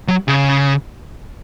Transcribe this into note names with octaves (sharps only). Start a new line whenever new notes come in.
F#3
C#3